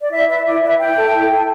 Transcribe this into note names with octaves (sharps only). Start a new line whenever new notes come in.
D5
E4 E5
B4 E5
E4 D5
B4 E5
E4 G5
A4
E4
A4